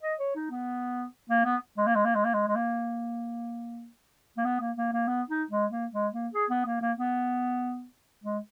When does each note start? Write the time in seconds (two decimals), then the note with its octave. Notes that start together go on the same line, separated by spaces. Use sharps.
0.03 D#5
0.19 C#5
0.36 D#4
0.51 B3
1.30 A#3
1.45 B3
1.77 G#3
1.87 A#3
1.95 G#3
2.05 A#3
2.15 G#3
2.25 A#3
2.34 G#3
2.48 G#3
2.56 A#3
4.37 A#3
4.45 B3
4.61 A#3
4.77 A#3
4.93 A#3
5.08 B3
5.29 D#4
5.51 G#3
5.71 A#3
5.93 G#3
6.13 A#3
6.34 G#4
6.50 B3
6.66 A#3
6.81 A#3
6.98 B3
8.24 G#3